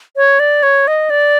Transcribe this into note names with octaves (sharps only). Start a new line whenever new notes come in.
C#5
D5
C#5
D#5
D5